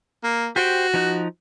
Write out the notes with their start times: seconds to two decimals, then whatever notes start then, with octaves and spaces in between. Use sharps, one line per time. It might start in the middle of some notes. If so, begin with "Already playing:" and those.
0.24 A#3
0.56 F#4 G4 C5 G5
0.94 F3 D#4 F#6